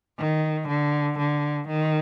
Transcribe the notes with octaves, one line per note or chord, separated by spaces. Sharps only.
D#3
D3
D3
D#3